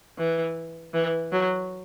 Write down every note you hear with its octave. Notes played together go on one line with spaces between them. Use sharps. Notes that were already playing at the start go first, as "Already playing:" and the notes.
E3
E3
F#3